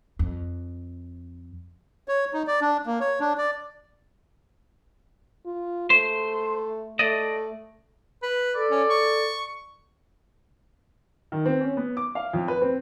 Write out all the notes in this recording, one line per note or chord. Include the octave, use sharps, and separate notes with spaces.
F2
C#5
D#4
D5
D4
A#3
C#5
D4
D5
F4
A3 C5
A3 D5 D#5
B4
A4 D5
C#4
C#6
D#3
C4
C#4
B3
D6
F5
F2
B4
C4